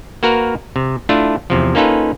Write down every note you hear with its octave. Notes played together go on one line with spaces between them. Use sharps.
A#3 F#4 A#4 B4
C3
A3 D4 E4 F4
E2 C3 F3
A#3 C#4 D#4 F4 A4 B4